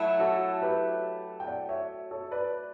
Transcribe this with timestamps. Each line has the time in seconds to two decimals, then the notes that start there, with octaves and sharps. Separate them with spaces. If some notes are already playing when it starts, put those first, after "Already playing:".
Already playing: F#3 A3 E4
0.20 F#4 A4
0.62 G4 B4
1.40 G5
1.47 D5 F#5
1.69 C#5 E5
2.11 A4 C#5
2.31 B4 D5